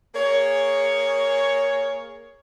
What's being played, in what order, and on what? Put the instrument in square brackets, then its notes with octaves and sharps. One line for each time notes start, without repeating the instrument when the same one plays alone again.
[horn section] A#3 G#4 C#5